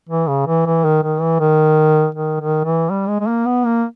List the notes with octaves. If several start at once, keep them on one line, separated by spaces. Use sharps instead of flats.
E3
C#3
E3
E3
D#3
D#3
E3
D#3
D#3
D#3
E3
G3
G#3
G#3
A#3
B3
A#3